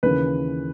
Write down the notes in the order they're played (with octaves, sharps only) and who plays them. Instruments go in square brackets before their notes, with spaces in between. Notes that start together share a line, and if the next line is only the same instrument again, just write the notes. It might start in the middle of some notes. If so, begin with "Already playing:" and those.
[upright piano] D#2 C#3 E3 B4